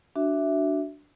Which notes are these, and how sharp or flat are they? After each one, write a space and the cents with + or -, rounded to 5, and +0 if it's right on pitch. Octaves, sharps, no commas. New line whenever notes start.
D4 +0 F#4 +5 E5 +0